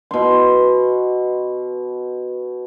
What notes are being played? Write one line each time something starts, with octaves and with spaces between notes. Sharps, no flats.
B2 C6